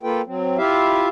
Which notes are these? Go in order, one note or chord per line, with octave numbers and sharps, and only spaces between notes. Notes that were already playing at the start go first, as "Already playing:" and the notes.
A#3 F4 A4 B4 G5
F#3 C4
E4 F4 G4 E5 F5